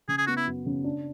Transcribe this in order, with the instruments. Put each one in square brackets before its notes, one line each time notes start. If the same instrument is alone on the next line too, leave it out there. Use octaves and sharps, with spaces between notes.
[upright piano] C#3 [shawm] G#4
[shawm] G#4
[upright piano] B3 [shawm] F#4
[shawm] E4
[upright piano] F#2
C#3
D4